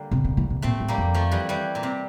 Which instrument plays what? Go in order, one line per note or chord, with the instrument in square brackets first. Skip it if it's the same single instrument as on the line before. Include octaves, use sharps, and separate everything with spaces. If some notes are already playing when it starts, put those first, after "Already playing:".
Already playing: [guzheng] D3 G3 A#3
[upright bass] C3
C3
E3
C3
[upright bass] A#2 [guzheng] A3 C4
[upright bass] A2
[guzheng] G3 A#3
[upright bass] F2
[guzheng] F3 A3
E3 G3
E3 G3
A#2
C3